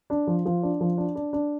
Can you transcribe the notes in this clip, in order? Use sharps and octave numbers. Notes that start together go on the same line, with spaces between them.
D4
F3
F3
D4
F3
D4
D4
D4